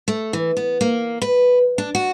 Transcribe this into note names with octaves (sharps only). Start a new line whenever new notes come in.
A3
E3
B3
A#3
B4
D4
F#4